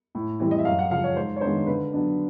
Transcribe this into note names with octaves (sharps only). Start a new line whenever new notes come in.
A2
E3 G3 C4
D#5
E5
F#2 F5
F#5
C#3 F3 F5
C#5
G#2 C5
C#5
D#3 G#3 B3 D4 C5
D3 B4
F#3 B3 D4